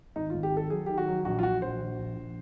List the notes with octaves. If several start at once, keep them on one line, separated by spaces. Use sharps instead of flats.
G#1 D#4
G#1 F4
G4
D#3 A4
F#3 G#4
D#3 G4
F#4
F#3
A#1 F#4
F4
A#1 F#4
A#1 C5
A#1
A#1
A#1